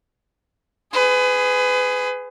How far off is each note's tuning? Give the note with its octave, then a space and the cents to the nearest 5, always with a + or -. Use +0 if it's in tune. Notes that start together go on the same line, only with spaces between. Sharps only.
G#4 +0 B4 +30